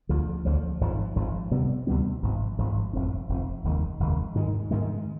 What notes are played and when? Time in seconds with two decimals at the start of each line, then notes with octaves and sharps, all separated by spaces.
0.09 D2 D3 F3
0.45 D2 D3 F3
0.81 G#1 G#2 F3
1.16 G#1 G#2 F3
1.51 D2 C3 G3 B3
1.87 D2 C3 G3 B3
2.22 G#1 G#2 F3
2.58 G#1 G#2 F3
2.93 F1 F2 C3
3.29 F1 F2 C3
3.64 F1 D#2 D#3 G#3
4.00 F1 D#2 D#3 G#3
4.35 G#2 D#3 G#3
4.71 G#2 D#3 G#3